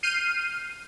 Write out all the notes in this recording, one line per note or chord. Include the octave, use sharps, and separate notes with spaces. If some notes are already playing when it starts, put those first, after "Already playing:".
F6 G6 C7 D#7